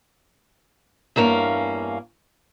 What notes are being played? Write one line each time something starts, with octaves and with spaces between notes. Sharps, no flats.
E2 G2 A#3 C#4 F5